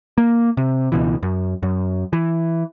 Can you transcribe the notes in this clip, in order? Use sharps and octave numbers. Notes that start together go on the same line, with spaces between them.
A#3
C3
C#2 B2 E3
F#2
F#2
E3